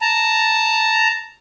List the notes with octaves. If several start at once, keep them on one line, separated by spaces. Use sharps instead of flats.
A5 A#5